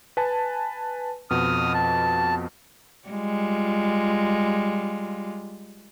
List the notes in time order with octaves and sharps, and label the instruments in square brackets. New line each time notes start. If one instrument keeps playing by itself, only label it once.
[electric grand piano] B4 G#5 A5
[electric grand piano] F2 B2 [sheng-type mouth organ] D#6 F6
[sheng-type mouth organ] A5
[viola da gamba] G3 G#3 F4